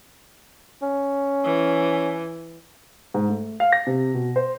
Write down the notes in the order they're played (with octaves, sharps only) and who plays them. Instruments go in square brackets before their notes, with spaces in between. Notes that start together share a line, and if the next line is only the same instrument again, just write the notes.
[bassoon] C#4
[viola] E3
[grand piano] G#2
A3
F5
A#6
C3
B2
C5